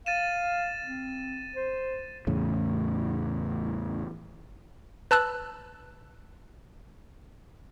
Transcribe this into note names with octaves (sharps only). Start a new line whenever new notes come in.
F5 A6 D#7 E7
C4
C5
E2 A2 C#3
B4 A5 E6 F#6